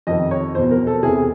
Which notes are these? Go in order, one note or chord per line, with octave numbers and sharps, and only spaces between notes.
F2 C3 D#3 D#5
C#5
E2 B2 C5
A#4
A4
E2 C3 E3 G#4